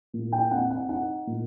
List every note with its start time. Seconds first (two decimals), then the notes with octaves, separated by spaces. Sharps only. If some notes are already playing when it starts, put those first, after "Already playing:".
0.14 A#2
0.32 G5
0.51 C4 F#5
0.70 F#5
0.89 D#4 F#5
1.27 A#2